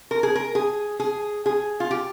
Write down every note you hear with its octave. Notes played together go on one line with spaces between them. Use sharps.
A#4
G#4
A#4
G#4
G#4
G#4
F4
G4